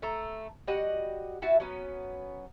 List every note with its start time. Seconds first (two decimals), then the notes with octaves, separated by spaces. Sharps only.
0.02 A3 A4 A#5
0.67 G3 F#4 D#5 F#5
1.42 E4 F#4 E5 A5
1.60 F#3 B3 C#4